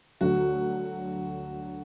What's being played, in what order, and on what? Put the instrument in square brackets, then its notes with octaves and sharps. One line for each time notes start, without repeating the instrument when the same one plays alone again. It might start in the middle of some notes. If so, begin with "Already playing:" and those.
[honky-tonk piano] D2 D3 F#3 [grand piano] F#4